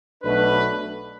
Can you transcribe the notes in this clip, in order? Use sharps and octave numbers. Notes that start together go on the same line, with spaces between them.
B1 B2 A3 D4 B4